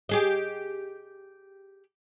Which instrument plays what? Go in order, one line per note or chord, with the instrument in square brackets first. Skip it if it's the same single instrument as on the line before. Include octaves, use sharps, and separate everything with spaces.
[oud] G4 G#4 D#5